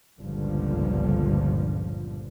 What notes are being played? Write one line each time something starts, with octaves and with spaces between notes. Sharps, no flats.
G1 C#2 G2 A#2 D3 F3